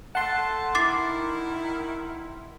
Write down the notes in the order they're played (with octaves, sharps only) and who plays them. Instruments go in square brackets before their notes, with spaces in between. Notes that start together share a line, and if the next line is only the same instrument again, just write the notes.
[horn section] A3 A5 [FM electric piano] F#5 C6
[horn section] D#3 E4 [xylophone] D6 A6 C7